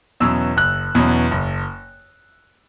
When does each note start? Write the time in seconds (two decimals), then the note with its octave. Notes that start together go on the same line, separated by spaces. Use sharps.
0.20 E2 B2 F#3 C#4 E6
0.56 F#1 F#6
0.95 E2 B2 F#3 C#4
1.31 F#1